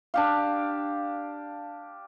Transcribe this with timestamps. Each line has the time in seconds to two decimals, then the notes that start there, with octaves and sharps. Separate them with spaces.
0.14 D4 G4 F5